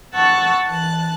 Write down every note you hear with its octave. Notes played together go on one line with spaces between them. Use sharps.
F#5 A5 C#6 E6 F#6
E3 A5 F#6